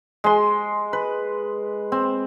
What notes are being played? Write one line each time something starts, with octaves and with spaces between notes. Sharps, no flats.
G#3 C6
B4
C4